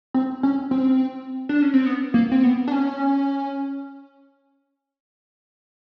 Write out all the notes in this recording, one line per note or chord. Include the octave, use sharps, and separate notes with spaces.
C4
C#4
C4
D4
C#4
C4
B3
A#3
C4
B3
D4
C#4